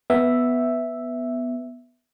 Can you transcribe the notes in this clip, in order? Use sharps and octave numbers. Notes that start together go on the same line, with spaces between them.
B3 E5